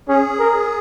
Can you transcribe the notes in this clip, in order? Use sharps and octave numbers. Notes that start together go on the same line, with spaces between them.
C#4 G#4
A#4